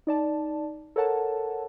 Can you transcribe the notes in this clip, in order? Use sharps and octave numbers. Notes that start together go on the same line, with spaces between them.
D#4 D5 A5
A4 A#4 C#5 F#5 A5